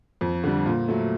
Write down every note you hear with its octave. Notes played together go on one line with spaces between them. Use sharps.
F2
D3 G3
A#2
F#3 A3